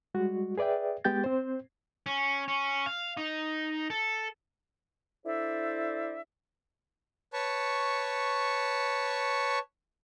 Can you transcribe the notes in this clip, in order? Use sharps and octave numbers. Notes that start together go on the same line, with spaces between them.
G3 G#3 F#4
G#4 B4 D5 E5 G5
G#3 B3 G4 G5 G6 A6
C4 C5
C#4
C#4
F5
D#4
A4
D4 E4 A4 C5 D5 E5
B4 C#5 A5 C#6